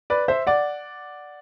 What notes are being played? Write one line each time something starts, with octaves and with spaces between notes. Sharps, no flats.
B4 D5
C5 E5
D5 F#5